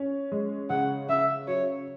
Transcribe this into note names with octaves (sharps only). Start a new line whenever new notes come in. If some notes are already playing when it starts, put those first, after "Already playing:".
Already playing: C#4
G#3
C#3 F#5
C#3 E5
F#3 C#5